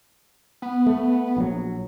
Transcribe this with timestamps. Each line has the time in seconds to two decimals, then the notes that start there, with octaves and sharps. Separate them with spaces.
0.62 B3
0.86 A3
1.37 A#1 C#3 F#3